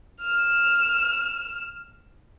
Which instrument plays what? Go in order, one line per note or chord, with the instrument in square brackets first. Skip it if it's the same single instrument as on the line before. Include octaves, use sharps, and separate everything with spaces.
[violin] F6 E7